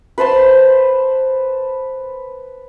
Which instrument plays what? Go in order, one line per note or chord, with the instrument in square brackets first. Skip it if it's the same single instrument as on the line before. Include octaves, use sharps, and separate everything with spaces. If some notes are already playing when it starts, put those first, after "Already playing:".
[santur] B4 C5 A5 C6